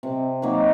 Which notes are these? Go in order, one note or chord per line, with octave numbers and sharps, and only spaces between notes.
C3
D#3 F#3 A#3